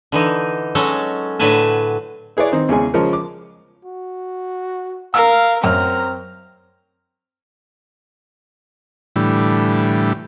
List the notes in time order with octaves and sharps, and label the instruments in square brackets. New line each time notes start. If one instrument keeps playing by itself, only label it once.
[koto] D3 E3 D#4
F#3 G#3 C#4 A4
A2 D3 F#3 B4 G#5 A5
[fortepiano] E4 G#4 B4 C#5 D5
D#3 C4 D#4
E2 C#3 G#3 C#4 G#4 G#5
C#3 F3 G#3 C#4 A#4
D6
[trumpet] F#4
[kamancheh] A#4 [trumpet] F5 [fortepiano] E6
[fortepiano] F#2 [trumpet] C4 [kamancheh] A#5 F6
[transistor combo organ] A2 D3 E3 G3